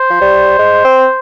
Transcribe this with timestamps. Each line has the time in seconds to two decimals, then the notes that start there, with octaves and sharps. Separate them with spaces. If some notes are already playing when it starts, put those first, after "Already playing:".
Already playing: C5
0.10 F3
0.21 G3
0.59 G#3
0.85 C4